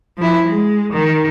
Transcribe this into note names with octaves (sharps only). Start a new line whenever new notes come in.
F3 E4
G#3
D#3